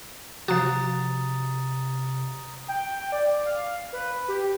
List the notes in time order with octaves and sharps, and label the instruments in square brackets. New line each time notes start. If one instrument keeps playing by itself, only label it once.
[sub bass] C3 [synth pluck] F3 F#4 [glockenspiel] A#5 D#6 A6
[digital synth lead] G5
D5
F5
B4
G4